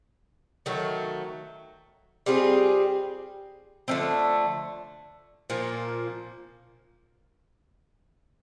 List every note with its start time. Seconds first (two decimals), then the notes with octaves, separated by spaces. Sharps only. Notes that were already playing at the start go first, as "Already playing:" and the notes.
0.66 D#3 F#3 A3
2.26 G3 C4 F4 G#4
3.88 D3 F3 A3 C4
5.50 A#2 F3 A#3